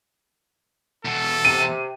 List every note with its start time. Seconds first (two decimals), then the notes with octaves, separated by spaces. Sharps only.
1.05 E2 B2 A4
1.45 C3 D#7